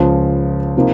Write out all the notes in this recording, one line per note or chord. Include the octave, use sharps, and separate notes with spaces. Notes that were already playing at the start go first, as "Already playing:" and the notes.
Already playing: C#2 C#3 F3
C3 F3 A#3 D#4